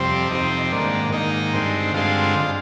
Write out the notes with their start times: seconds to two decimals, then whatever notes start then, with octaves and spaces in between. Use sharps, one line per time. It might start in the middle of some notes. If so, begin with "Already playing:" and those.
Already playing: F2 C3 G3 C4
0.30 F2 C3 G3 C4 D#4
0.71 G#2 D#3 A#3 D4
1.12 G#2 D#3 A#3 D#4
1.53 G2 D3 G#3 C4
1.94 G2 D3 G#3 C4 F4